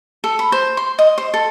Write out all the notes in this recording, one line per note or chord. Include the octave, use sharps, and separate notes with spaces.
A4
B5
C5
C6
D#5
C5
A4